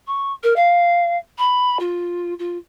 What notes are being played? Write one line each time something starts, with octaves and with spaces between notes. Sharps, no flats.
C#6
A#4
F5
B5
F4
F4